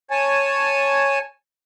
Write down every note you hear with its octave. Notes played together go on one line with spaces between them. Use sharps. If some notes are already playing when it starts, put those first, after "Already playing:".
C#5 G#5 A5